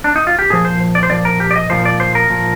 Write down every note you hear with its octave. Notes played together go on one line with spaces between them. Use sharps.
D4
D#4
F4
G4
A#2 F3 G#4
C5
D5
C5
A#2 F3 D5
A#4
G4
D5
D#5
A#2 F3 C5
D5
C5
A#4
A#2 F3